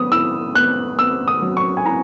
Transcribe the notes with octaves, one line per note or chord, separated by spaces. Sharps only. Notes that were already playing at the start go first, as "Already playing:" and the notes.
Already playing: F#3 B3 D#6
E4 E6
B3 F#6
B3 E6
D#6
F#3
C#6
G#5
E4 A#5